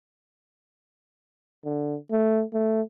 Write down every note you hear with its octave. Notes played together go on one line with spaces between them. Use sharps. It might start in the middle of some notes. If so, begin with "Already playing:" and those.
D3
A3
A3